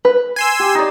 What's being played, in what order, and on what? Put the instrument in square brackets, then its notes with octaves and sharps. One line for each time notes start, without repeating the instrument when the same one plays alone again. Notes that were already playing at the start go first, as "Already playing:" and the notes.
[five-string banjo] B4
[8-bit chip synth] G#5 C6 E6
[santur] G4
D#4 D5